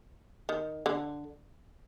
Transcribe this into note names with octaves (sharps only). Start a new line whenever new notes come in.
D#3
D3